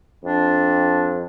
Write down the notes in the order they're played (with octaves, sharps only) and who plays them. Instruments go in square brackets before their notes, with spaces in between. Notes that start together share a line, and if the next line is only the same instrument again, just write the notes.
[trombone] F2 [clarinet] D4